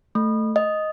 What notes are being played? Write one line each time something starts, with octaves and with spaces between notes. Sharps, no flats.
A3
D#5